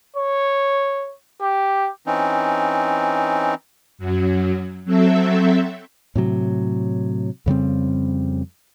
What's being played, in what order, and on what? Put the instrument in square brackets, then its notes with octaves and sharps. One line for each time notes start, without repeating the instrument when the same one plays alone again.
[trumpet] C#5
G4
[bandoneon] E3 C4 C#4 D#4
[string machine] F#2 F#3
F#3 C4 A4 E5
[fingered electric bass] A2 C3 F#3
F2 C#3 G3 C4